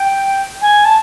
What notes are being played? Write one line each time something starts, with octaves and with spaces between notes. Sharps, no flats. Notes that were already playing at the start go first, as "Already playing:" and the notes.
Already playing: G5
G#5
A5